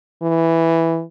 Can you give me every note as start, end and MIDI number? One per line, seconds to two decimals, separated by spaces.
0.23 1.03 52